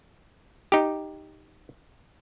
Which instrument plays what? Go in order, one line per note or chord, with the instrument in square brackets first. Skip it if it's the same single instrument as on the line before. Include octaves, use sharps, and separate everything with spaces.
[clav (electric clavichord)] D#4 G4